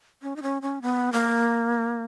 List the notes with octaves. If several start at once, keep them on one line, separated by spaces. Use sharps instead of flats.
C#4
D#4
C#4
C#4
B3
A#3